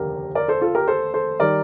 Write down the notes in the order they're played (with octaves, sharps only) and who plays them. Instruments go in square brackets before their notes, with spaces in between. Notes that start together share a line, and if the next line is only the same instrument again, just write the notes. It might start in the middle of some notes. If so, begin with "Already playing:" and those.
Already playing: [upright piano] F1 D#2 D3 G4 A#4
A#4 D5
A4 C5
F4 A4
G4 A#4
A4 C5
A4 C5
D#3 G3 A#4 D5